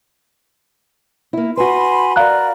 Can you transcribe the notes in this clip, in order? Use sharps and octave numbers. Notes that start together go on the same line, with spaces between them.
A#3 E4
F#4 B4 G#5 B5 C6
A#4 D5 F5 A#5 F#6